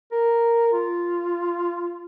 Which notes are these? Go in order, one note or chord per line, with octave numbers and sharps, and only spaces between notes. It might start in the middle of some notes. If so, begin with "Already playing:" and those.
A#4
F4